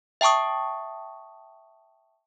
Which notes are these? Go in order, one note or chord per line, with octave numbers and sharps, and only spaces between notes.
E5 G5 A5 C#6 D#6